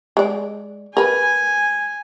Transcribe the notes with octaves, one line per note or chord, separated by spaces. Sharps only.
G#3 D5
A#4 B4 G#5